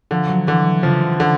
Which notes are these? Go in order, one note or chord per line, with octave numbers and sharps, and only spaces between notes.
D3 F3
F#3
D3 E3
C#3 F3
D3